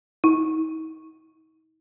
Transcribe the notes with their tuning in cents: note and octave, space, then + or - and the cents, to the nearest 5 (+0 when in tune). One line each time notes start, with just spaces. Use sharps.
D#4 +40